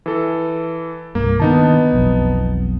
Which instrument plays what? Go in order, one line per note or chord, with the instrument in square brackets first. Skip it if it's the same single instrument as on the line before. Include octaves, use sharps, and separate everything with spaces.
[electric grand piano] E3 A4
[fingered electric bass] C2 G2 [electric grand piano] A#3
[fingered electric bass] D#3 D4 [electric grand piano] B3 D#4 A5
[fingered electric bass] E1 B1 F2